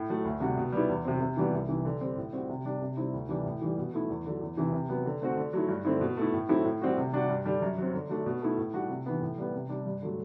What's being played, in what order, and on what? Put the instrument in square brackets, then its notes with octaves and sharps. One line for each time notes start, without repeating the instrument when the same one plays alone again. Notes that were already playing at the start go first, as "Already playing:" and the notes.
Already playing: [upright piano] A2
F#3 A3
D2
C3 G3 D4 F#4
B2
G3 B3 E4
E2
C3 F#3 C4
C3
E3 G3 B3 F#4
C2
C3 E3
D3
G3 C4
A2
G3 C4 F#4
C3
G3 D4
C3
G3 C4 E4
D2
C3 E3 G3 D4
A2
E3 G3
B2
A3 E4
E2
D3 F#3
E2
C3 E3
C3
F#3 B3
D3
A3 C4 F#4
D3
F#3 A3 E4
G2
D3 A3 C4 E4
B2
A3 E4
A2
F#3 A3 C4 E4
A2
G3 C4 F#4
C3
G3 D4 F#4
G2
D3 G3 D4
F#2
F#3 C4
D3
F#3 A3 D4
B2
A3 E4
A2
G3 D4 F#4
C3
E3 B3
A2
G3 B3
C3
G3 D4
G2
D3 F#3 A3